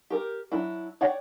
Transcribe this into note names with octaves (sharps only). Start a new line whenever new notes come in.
G4 A#4
F#3 D4 E4
C#5 D5 F#5 G5